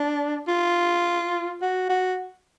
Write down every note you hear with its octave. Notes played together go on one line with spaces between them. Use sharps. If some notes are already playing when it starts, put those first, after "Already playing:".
Already playing: D4
F4
F#4
F#4